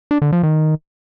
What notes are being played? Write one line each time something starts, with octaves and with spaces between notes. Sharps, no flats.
D4
D3
F3
D#3